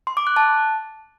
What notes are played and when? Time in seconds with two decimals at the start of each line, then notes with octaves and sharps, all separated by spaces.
0.07 C6
0.17 D6
0.27 F#6
0.37 A5